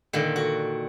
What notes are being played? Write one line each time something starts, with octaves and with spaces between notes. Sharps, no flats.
A#2 D3 D#3
F#4